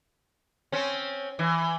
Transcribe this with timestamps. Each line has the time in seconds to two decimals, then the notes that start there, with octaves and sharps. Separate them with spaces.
0.72 C4 C#4
1.39 E3